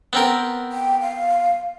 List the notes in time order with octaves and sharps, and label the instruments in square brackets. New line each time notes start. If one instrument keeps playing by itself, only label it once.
[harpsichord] B3 C4 A#4
[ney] G5
F5